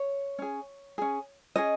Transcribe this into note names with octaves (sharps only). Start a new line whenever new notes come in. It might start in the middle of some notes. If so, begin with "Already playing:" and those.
Already playing: C#5
C#4 G#4
C#4 G#4
C#4 G#4 D#5